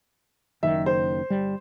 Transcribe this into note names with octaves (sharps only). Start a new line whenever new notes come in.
F#1 F#2 D#3 E5
C5
G1 G3